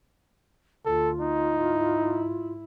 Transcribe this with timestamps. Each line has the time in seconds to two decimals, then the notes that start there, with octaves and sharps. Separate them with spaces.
0.86 D2 F4 A4
1.20 D#4
1.49 G#2 E4